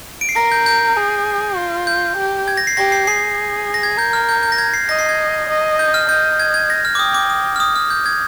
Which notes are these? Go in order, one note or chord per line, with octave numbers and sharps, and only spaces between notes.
D7
C7
A#4 A#6
G6
G6
G#4
F4
G6
G4
G#6
A#6
C7
G4 A#6
C7
G#4 C7
A#6
G#6
A#4 G6
F6
G6
G6
A#6
G#6
C7
D#5 A#6
C7
G#6
D#5
G6
F6
D#5 G6
G#6
G#6
A#6
F6
D6
G5 D#6
D6
D#6
F6
D#6
F6
G6
G#6